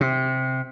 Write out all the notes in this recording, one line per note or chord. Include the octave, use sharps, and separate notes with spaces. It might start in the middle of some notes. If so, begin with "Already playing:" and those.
C3